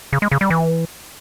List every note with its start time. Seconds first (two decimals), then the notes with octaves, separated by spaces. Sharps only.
0.13 C#3
0.22 G#3
0.31 C#3
0.41 G3
0.50 E3